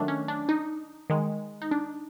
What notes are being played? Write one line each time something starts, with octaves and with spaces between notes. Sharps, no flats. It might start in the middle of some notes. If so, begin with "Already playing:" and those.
Already playing: D#3 F#3 A3 D4
C#4
D4
D#4
D#3 G#3
D#4
D4